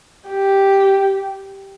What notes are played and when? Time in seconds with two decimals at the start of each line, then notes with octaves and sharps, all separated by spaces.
0.28 G4